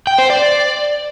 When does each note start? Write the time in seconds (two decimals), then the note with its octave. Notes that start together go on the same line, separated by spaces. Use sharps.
0.07 G5
0.19 C5
0.30 D5